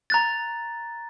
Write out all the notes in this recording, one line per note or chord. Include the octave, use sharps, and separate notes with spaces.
A#5 F#6 A6